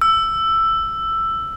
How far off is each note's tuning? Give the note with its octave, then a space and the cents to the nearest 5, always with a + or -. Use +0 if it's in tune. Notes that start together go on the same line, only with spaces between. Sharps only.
E6 +10